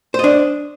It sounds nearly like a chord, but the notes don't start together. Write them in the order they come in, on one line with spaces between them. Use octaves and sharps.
C5 D#5 D4